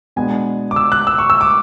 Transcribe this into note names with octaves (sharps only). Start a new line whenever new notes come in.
B2 G#3 B3 D4 G#5
D6
E6
F#6
E6
C#6
E6
D6